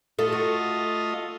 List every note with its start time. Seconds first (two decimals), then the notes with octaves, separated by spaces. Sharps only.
0.19 A3 F4 A4 D#5
0.32 F#4